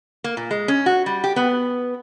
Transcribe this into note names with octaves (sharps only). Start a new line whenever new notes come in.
A#3
A#2
G#3
C#4
F#4
G3
G4
B3